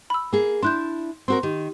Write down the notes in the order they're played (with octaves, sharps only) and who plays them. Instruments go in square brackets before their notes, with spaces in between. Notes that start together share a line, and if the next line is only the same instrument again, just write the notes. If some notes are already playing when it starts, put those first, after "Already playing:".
[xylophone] B5 E6
[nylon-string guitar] A#3 G#4
[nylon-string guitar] D4 E4 [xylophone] C6 F#6 G6
[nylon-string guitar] C4 F#4 A#4 [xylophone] C6
[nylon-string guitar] D#3 [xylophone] G4